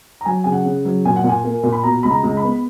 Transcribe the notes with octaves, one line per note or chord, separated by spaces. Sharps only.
A#5
F#3 G#5
C#3 G#5
F#5
C#3
F#3
A#2 G#5
F#5
A#2
G#5
A#3
A#2
B5
B2 A#5
C#2 B5
A#5
C#2
B5
B3